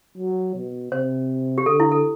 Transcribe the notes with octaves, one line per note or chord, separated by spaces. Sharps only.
F#3
B2
C3 C5
G4
D3 A4
E4
A4